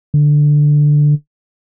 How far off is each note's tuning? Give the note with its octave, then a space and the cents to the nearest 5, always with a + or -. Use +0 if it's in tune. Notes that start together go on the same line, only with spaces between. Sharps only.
D3 +5